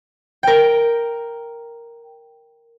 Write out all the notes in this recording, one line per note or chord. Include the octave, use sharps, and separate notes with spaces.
A#4 G5